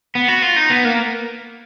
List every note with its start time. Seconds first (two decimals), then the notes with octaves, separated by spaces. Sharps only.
0.15 B3
0.28 F#4
0.42 F4
0.56 D#4
0.70 B3
0.85 A#3